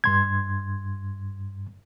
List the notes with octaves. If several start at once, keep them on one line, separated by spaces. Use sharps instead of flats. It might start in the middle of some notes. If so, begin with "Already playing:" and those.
G2 C6 G#6